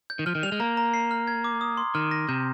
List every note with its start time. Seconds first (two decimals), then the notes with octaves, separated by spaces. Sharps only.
0.10 G6
0.19 D#3
0.26 F3 F6
0.35 D#3
0.43 G3 F7
0.52 G#3
0.60 A#3 A#5
0.77 A#5
0.94 C7
1.11 F6
1.27 G#6
1.44 D6
1.61 D#6
1.77 C6
1.95 D#3 F6
2.11 A#6
2.29 C3 G6